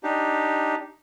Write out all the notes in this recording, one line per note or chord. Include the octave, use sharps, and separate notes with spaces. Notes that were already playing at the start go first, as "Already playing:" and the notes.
D4 D#4 G4